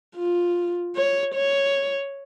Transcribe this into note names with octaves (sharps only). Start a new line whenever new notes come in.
F4
C#5
C#5